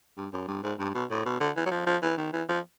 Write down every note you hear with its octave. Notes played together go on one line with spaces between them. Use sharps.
G2
F#2
G2
G#2
G2
B2
A2
B2
D3
E3
F#3
F3
F3
E3
D#3
E3
F3